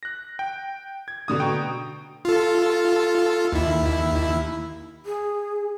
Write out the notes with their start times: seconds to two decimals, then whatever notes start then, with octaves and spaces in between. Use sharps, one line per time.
0.03 F#6 A#6
0.39 G5
1.08 G#6
1.28 B2 D3 D#6
1.40 G5 A#5 C#6
2.25 F4 A4
3.52 D#2 E4
5.06 G#4